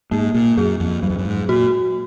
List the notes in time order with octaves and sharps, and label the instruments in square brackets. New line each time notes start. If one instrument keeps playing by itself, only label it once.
[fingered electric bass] G#2 [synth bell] A#3
[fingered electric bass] A#2
[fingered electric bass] F#2 [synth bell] G#4
[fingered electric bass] F2
[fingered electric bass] F#2 [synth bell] F#3
[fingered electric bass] F2
F#2
G#2
[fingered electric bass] A#2 [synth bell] F#4